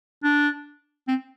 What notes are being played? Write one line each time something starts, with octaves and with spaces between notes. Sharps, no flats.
D4
C4